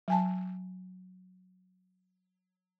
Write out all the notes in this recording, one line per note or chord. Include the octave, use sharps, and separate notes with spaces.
F#3 G#5 A5